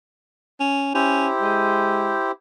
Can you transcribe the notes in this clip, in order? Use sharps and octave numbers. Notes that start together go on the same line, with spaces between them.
C#4
C#4 E4 G4 C5
G#3